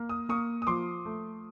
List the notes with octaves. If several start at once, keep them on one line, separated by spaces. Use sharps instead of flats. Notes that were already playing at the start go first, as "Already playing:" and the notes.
Already playing: A#3
D#6
A#3 C#6 D#6
D#6
F3 C6 D6
A3